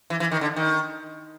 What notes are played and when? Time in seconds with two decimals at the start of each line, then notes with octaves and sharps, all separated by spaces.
0.10 E3
0.20 E3
0.31 D#3
0.41 D3
0.56 D#3